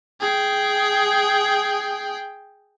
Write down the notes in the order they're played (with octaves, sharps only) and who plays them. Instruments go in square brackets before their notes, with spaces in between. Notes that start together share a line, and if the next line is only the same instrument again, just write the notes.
[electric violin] G#4 G5